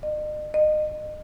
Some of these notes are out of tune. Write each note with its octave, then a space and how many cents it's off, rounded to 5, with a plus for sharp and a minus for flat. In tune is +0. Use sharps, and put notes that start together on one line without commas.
D#5 -45
D#5 -30